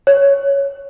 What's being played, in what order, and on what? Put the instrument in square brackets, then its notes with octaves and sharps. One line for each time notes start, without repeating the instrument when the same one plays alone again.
[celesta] C#5